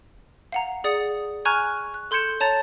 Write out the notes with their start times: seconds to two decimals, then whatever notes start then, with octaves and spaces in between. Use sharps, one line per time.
0.52 F5 F#5 A#5
0.84 G#4 D5 F#5 D#6 C#7
1.45 G#5 A#5 C#6 F6 F#6 G#6
1.94 F#6
2.11 A4 C6 G6 G#6 C#7 E7
2.40 C#5 A5 A#5 A6